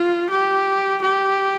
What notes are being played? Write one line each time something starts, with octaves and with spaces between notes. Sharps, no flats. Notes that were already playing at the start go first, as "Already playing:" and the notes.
Already playing: F4
G4
G4